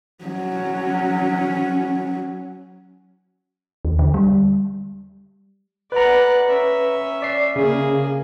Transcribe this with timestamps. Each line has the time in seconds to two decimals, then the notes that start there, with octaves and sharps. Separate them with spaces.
0.24 F#3 C#4
3.85 D#2
3.99 D3
4.14 G3
5.92 B4 D5 F#5 A#5
6.49 C#4 E5
7.22 D5 C7
7.56 C#3 A#3 G#4